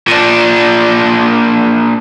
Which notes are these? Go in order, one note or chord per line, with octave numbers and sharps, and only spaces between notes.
A#2 D4